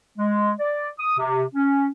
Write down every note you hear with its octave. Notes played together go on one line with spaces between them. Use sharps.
G#3
D5
D#6
C3
C#4